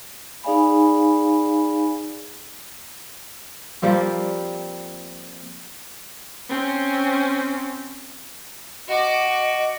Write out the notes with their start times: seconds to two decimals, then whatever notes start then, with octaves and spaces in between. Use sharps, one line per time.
0.44 D#4 G#4 D5 F5 G#5 B5
3.82 F3 G3 A#3 C4
6.49 C4 C#4
8.88 F#4 D#5 D6